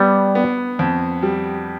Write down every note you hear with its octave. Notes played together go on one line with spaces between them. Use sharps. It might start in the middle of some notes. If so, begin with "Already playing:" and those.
Already playing: G3 B3
B3
F2
G3